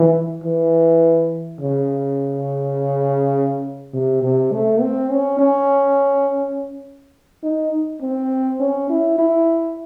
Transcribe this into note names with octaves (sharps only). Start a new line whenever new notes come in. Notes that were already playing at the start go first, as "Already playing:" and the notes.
Already playing: E3
E3
C#3
C3
C3
A3
C4
C#4
C#4
D#4
C4
C#4
E4
E4